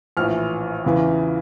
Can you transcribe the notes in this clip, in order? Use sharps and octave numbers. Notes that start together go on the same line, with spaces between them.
A#1 A2 E3 F6
E2 C#3 E3